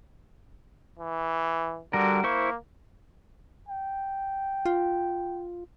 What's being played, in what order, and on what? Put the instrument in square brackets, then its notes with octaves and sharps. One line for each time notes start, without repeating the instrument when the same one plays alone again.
[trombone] E3
[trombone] D3 [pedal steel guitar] G3 F#4 A#4
[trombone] A#3 [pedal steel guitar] E4 C5 C#6
[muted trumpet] G5
[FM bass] F4